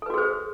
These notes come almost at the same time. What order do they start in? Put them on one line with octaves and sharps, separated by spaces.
A4 B4 F#4 G#4 C5